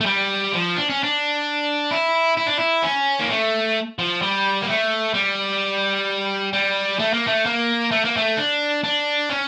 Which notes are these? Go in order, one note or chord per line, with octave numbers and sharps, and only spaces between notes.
A3
G3
F3
D4
C#4
D4
E4
E4
D4
E4
C#4
A#3
A3
F3
G3
A#3
A3
G3
G3
A3
A#3
A3
A#3
A3
A#3
A3
D4
D4
C#4